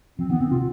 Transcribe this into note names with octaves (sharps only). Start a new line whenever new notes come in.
F3 C4
D#3 B3
D3 C4
C3 F4